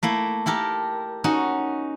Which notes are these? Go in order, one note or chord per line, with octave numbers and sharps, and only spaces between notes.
A3 A#3 E4
E4 G4 A4 A#4
C#4 D#4 F#4